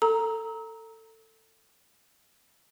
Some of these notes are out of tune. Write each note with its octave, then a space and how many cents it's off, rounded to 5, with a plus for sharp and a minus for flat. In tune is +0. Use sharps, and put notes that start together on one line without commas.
A4 +20 A#5 +0 E6 -35